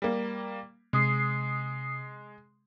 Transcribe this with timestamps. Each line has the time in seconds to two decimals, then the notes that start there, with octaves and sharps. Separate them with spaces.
0.02 G3 A#3
0.93 C3 G#3 D#6 C7